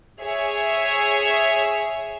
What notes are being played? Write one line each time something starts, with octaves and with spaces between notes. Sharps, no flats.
G#4 C#5 E5